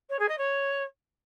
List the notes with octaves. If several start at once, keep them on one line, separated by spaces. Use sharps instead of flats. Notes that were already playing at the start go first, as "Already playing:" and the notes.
C#5
G#4
D#5
C#5